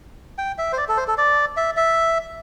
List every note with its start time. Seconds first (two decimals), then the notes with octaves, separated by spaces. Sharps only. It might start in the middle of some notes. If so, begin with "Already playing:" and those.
0.38 G5
0.58 E5
0.73 C5
0.78 D5
0.88 A4
0.97 C5
1.07 A4
1.18 D5
1.57 E5
1.77 E5